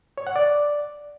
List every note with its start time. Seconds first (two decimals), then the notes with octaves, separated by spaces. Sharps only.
0.18 C#5
0.27 F#5
0.36 D5